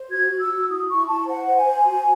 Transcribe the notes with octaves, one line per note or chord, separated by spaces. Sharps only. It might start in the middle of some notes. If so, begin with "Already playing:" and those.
Already playing: C5
F#4 G#6
F#4
E6
F#4
E4 D#6
E4 C#6
E4 A5
C5 F#5
C5
G#5
C5
F#4